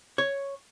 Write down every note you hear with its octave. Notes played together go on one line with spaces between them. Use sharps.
C#5